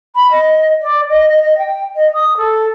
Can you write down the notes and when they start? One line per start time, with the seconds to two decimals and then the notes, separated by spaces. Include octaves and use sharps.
0.15 B5
0.31 D#5
0.82 D5
1.09 D#5
1.29 D#5
1.42 D#5
1.58 G5
1.96 D#5
2.14 D#6
2.37 A4